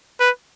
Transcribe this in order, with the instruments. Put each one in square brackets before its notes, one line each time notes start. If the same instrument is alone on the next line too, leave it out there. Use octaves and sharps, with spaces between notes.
[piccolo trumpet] B4